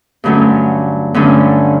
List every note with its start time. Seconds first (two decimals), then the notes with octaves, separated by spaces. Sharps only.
0.24 G2 D3 F#3 A3 C#4
1.14 G2 D3 F#3 A3 C#4